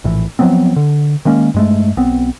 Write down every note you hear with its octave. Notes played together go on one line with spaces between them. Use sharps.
A#1 A2 E3
F3 F#3 B3 C4
D3
D#3 G#3 A#3 C#4
G2 G#3 A3
B1 B3 C4